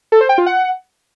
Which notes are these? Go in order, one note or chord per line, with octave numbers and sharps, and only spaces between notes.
A4
C5
G5
F4
F#5